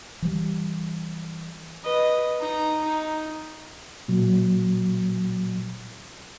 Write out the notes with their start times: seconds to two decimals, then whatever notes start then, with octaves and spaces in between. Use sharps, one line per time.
0.22 E3 G3
1.83 B4 D#5
2.40 D#4 A#5
2.84 D#4
4.08 A#2 F#3